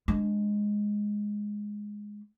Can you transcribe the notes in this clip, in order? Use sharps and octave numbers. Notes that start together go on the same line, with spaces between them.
G#3 D4